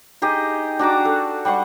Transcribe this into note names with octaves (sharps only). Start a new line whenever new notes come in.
D#4 G4 G#4 D#5
D4 F#4 A#5 D6
A4
G3 F#5 C6 C#6